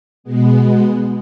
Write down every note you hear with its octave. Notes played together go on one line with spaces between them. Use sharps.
B2 G#3 B3